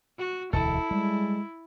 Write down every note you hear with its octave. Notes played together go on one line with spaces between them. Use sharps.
F#4
E1 D2 E4 A4 A5
G3 G#3